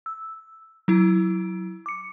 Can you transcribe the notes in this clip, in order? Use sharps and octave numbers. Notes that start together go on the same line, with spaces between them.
E6
F#3 E4
D6 C#7